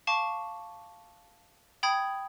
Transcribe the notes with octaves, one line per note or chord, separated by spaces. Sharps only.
F5 A5 C#6 D6
G5 B5 D#6 G#6